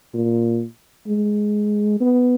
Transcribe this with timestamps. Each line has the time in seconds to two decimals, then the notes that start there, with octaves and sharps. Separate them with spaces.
0.14 A#2
1.07 G#3
2.00 B3